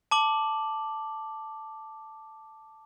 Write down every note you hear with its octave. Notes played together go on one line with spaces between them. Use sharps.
A5 D6 F#7